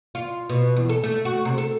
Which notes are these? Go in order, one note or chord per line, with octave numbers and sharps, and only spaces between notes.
F4
B2
E2
A4
A3
F#4
C3
A4